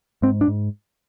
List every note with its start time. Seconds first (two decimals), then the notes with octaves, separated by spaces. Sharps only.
0.22 G#2 C4
0.41 D4
0.48 G#2